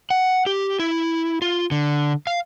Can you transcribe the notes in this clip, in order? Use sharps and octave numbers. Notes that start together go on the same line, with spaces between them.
F#5
G4
E4
F4
D3
F5